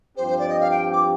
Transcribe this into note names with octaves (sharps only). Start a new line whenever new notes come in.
G2 F3 C4 G4 C5
C5
D5
D#5
F5
G5
D6